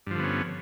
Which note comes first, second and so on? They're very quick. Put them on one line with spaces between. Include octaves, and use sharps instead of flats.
G2 F3 D3 B3 C#4